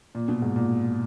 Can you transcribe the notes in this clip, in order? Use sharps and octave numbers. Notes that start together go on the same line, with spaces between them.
A#2
B2
G#2
A#2